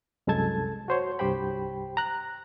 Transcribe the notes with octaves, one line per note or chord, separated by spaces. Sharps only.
C2 F#2 G#3 A4 A5 G#6
F#4 C5 C#5
C2 G2 G4 C5 G5 B5
A#5 F#6